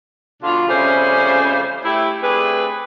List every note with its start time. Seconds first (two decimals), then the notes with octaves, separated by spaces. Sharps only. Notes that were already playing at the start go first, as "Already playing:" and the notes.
0.43 B2 D3 D4 F4
0.68 F2 C#3 G3 A3 C#4 C5
1.84 A3 E4 G4
2.21 A3 C4 D4 G#4 B4